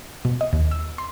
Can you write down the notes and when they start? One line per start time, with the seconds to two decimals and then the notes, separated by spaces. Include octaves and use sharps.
0.25 B2
0.41 D#5
0.53 D#2
0.71 E6
0.98 C6